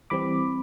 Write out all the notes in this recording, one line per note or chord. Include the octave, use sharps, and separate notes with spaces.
E3 G3 C4 B5 D6